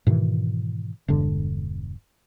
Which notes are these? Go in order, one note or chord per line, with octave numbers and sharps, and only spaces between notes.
G#2 B2 D#3 E3
E1 G2 D3